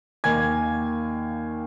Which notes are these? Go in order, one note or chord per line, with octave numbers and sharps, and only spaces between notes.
D#2 D#3 A#3 G#5 G#6